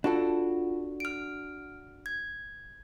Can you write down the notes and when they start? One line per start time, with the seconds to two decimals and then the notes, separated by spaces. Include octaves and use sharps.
0.04 D4 F4 F#4 A4
1.00 F6 D7
2.06 G#6